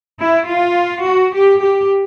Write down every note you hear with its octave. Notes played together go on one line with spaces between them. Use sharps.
E4
F4
F#4
G4
G4